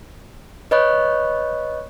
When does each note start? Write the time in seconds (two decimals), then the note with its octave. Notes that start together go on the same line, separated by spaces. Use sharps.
0.71 B4 C#5 D#5 B5 C#6 F#6